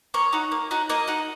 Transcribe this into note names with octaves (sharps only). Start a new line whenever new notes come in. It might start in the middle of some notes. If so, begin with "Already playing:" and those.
A#3 C#5
D#4 F#4
A#3
D#4 F#4
A#3 D#5
D#4 F#4